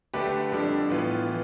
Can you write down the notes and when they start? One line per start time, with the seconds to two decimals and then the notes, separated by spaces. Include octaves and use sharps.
0.14 D3 A3 D4 G4 B4
0.52 F2 D3 G3 D4
0.89 A2 E3 B3 F4 B4
1.27 E3